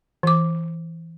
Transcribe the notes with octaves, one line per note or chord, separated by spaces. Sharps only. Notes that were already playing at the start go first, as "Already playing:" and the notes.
E3 D6